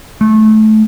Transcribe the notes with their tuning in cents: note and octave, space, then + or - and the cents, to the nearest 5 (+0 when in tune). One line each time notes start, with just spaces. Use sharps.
A3 -20